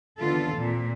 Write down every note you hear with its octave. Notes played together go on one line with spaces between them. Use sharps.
D#2 D3 E3 B3 F4 A4
A#2 C4